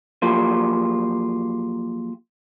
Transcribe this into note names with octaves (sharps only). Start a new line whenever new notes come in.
F3 F#3 A#3 F4 G4 G#4